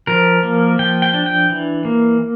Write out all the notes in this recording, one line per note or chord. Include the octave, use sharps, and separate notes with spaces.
F3 A#4
A#3
F3 G5
G5
D4
G5
E3
A#3